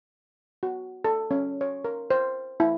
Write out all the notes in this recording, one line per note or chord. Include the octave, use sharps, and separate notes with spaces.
F#4
A4
C#4
C#5
A#4
C5
E4